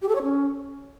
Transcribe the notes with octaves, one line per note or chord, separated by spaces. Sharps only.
G4
A4
C#5
C#4